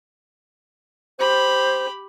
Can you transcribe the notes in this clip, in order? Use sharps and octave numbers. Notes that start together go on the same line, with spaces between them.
G4 C5 B5